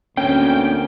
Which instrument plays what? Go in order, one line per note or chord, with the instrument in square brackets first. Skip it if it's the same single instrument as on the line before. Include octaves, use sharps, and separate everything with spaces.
[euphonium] D2 [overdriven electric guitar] A#3 C4 [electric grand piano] C#4 [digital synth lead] G5